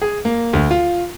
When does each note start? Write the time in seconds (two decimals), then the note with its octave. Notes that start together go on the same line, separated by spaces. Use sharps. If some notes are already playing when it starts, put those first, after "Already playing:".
0.02 G#4
0.25 A#3
0.53 D2
0.71 F4